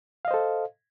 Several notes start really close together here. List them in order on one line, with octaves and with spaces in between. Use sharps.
F5 D#5 C5 A4